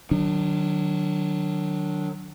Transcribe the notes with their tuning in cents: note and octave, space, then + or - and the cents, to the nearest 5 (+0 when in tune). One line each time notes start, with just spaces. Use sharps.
D#3 -35 F#3 +0 D4 +0